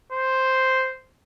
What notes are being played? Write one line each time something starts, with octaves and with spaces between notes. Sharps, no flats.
C5